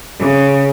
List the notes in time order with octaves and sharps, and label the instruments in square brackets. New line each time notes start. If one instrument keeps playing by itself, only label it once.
[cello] C#3